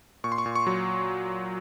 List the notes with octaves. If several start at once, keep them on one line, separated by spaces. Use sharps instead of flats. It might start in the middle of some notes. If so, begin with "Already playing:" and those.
A#2 C#6
C6
C#6
A#2
C#6
F#3